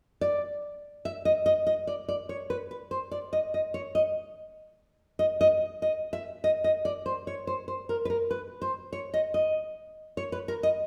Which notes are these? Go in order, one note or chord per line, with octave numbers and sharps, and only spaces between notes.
D5
E5
D#5
D#5
D#5
D5
D5
C#5
B4
B4
C5
D5
D#5
D#5
C#5
D#5
D#5
D#5
D#5
E5
D#5
D#5
D5
C5
C#5
C5
C5
A#4
B4
A#4
B4
C5
C#5
D#5
D#5
C#5
B4
A#4
D#5